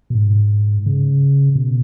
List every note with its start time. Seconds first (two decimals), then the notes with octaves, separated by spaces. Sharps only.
0.10 B2
0.15 G#2
0.86 C#3
1.55 B2